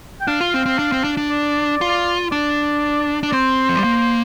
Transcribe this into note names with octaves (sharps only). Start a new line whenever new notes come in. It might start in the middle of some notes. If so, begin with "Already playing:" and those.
G5
D4 F5
F4
C4
C4
D4
C4
D4
D4
D5
F4
D4 D5
D4
D5
C4 C5
F3
G3
A#3